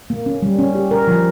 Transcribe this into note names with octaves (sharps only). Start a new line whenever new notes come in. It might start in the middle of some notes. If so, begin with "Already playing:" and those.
A#3
C#4
G3
C#4
G4
A#4
F3